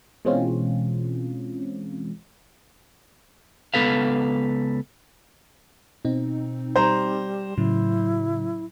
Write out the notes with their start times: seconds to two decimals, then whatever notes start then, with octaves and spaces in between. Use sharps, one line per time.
0.25 B2 E3 G#3 C4 C#4 F4
3.74 C#2 F3 B3 A4 B4 F5
6.05 B2 C4 D#4
6.76 G3 C5 A#5
7.58 A2 C#3 F#3 E4